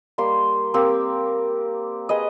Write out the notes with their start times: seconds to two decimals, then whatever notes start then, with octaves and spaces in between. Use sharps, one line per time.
0.18 G3 A#3 C6
0.74 A#3 C4 G4 A#4
2.09 G#4 B4 D#5